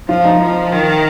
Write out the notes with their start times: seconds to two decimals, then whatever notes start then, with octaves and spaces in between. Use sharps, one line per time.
0.08 F3 F4
0.25 D#4
0.41 F3
0.72 D#3